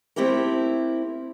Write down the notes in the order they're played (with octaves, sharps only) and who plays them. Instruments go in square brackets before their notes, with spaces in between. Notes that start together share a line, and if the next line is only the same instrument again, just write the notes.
[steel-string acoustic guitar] A3 C4 E4 G4 A#4